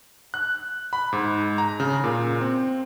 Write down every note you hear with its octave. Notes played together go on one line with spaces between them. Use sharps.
F#6
B5
G#2
A#5
C#3
A#2
C4